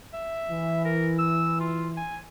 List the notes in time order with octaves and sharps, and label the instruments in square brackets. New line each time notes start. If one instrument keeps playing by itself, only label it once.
[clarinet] E5
[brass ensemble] E3
[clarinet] A#4
E6
F4
G#5